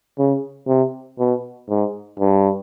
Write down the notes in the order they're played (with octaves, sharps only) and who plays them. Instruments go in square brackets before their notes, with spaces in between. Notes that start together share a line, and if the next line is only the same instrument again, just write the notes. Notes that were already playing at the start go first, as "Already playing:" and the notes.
[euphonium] C#3
C3
B2
G#2
G2